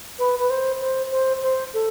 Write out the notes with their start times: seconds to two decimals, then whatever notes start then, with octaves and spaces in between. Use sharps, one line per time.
0.19 B4
0.39 B4
0.50 C5
0.81 C5
1.11 C5
1.42 C5
1.74 A4